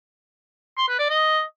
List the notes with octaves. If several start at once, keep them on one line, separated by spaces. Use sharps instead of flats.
C6
B4
D5
D#5